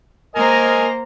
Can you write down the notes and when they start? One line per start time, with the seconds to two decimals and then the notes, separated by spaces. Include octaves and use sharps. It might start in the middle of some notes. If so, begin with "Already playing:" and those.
0.35 A#3 A#4 C5 D#5 G#5 A#5